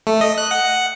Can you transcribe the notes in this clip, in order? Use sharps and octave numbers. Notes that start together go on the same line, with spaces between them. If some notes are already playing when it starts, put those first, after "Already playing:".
A3
D#5
F#6
F#5
F#5